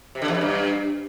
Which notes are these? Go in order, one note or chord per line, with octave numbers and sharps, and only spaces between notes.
C3
D3
E2
F#2
G2